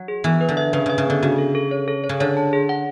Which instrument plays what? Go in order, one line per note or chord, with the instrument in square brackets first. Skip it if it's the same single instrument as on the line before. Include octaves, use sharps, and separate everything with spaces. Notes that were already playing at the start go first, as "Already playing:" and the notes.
Already playing: [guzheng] F#3
[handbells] G#4
[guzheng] E3 [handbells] B3
[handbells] B4
[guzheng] D3
[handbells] E5
[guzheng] C#3 [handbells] B4
[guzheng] C#3 [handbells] E5
[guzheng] C#3
[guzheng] D3 [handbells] B3
[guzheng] C#3 [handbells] F#4
[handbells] A4
A4
C#5
A4
C#5
[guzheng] C#3
[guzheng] D3 [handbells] C#5
[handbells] A5
G#4
F#5